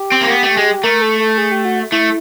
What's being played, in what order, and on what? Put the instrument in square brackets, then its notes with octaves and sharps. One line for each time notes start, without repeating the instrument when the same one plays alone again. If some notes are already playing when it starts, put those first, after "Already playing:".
Already playing: [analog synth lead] G4
[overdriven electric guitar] C4
A#3
B3
A3
G#3
[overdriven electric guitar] A3 [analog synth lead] A#4
[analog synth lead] A4
A4
G#4
G4
F#4
[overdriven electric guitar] A3 [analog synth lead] E4